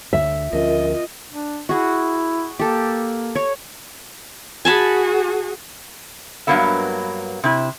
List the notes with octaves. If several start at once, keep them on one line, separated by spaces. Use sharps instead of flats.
D2 D3 E5
D2 F3 C#4 F4 A#4 D#5
D4
E4 F#4 G#4
A#3 G4 A4
C#5
F#4 G#4 G#5 A5 B5
G2 E3 F#3 A#3 B3 E5
C3 E4